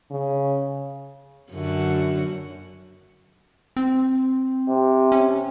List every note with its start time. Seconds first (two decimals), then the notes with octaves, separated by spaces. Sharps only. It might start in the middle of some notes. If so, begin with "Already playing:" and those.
0.11 C#3
1.52 F#2 D3 F#4
3.77 C4
4.68 C3
5.12 C#4